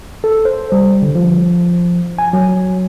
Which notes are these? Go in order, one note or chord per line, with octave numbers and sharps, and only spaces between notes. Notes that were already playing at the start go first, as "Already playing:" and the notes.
A4
C5
G3
D3
F3
G#5
F#3